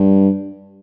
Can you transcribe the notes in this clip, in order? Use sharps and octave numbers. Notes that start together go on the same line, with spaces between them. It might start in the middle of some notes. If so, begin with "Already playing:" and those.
Already playing: G2